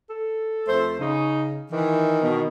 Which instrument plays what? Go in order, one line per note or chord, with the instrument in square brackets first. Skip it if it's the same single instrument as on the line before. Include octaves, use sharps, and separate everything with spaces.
[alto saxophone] A4
[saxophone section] F2 A3 C5
[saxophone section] C#3 [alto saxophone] D#4
[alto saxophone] D#3 [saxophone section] E3
[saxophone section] B2